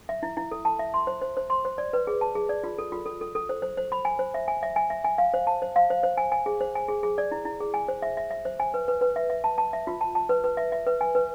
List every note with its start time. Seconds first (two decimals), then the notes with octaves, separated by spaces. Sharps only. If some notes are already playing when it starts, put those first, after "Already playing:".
0.09 E5
0.23 E4
0.37 E4
0.51 A4
0.65 A5
0.79 E5
0.94 C6
1.07 C5
1.21 C5
1.37 C5
1.50 C6
1.65 C5
1.78 D5
1.93 B4
2.07 G#4
2.21 A5
2.35 G#4
2.49 D5
2.64 F4
2.78 A4
2.92 F4
3.06 A4
3.21 A4
3.35 A4
3.49 C5
3.62 C5
3.77 C5
3.92 B5
4.05 G#5
4.19 C5
4.34 E5
4.48 G#5
4.63 E5
4.76 G#5
4.90 E5
5.04 G#5
5.18 F5
5.34 C5
5.47 A5
5.62 C5
5.76 F5
5.90 C5
6.03 C5
6.17 G#5
6.32 G#5
6.46 G#4
6.61 C5
6.75 G#5
6.88 G#4
7.03 G#4
7.18 D5
7.31 E4
7.45 E4
7.60 G#4
7.74 G#5
7.88 C5
8.02 E5
8.17 E5
8.31 E5
8.45 C5
8.60 G#5
8.74 B4
8.88 B4
9.01 B4
9.16 E5
9.30 E5
9.44 A5
9.58 A5
9.73 E5
9.87 F4
10.01 A5
10.15 A5
10.29 B4
10.44 B4
10.57 E5
10.72 E5
10.86 B4
11.01 G#5
11.15 B4